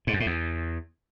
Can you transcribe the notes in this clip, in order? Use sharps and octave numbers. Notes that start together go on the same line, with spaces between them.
G#2
F#2
A2
E2